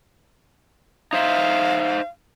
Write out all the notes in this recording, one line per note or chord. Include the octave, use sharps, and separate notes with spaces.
D#4 C5 E5 F5